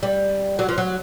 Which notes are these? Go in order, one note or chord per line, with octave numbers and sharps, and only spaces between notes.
G3
F#3
F3
F#3